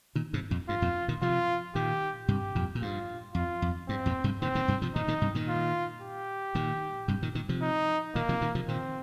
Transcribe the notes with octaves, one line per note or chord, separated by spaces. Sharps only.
A#2 D#3
G2 C3
F2 A#2
G2 F4
F2 A#2
A#2 D#3
C3 F3 F4
A#2 D#3 G4
G2 C3 G4
F2 A#2
A#2
G2 F4
F2 F4
F2
G2 C4
F2 A#2
G2 C3
A#2 D#3 C4
A#2 D#3
G2 C3
C3 F3
A#2 D#3 D#4
A#2 D#3
G2 C3
A#2 D#3
F4
G4
A#2 D#3
G2 C3
A#2 D#3
A#2 D#3
C3 F3
D#4
A#2 D#3 A#3
C3 F3
A#2 D#3
C3 F3
A#2 D#3 C4